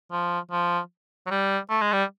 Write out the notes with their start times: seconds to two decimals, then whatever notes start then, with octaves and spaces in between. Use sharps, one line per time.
0.11 F3
0.51 F3
1.26 F#3
1.30 G3
1.70 A3
1.81 G#3
1.93 G3